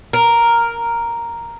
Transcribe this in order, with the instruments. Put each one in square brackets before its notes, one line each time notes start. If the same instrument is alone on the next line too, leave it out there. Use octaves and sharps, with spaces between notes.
[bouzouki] A#4